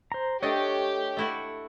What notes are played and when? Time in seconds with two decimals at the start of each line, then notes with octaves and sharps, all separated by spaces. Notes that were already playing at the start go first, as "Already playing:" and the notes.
0.12 C5 A#5
0.42 A3 D4 G4 C#5 D#5 G5
1.17 A3 E4 F#4